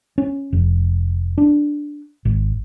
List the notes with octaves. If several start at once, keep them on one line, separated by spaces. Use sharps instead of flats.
C#4
F1
D4
G#1